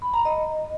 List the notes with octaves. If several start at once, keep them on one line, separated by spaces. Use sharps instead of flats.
B5
A#5
D#5